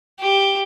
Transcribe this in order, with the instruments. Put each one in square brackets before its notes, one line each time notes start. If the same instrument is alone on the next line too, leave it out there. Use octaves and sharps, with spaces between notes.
[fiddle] G4